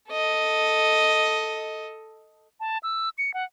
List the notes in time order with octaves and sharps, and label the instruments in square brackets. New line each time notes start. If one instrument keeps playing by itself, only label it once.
[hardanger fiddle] A4 D#5
[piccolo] A5
E6
C#7
F#5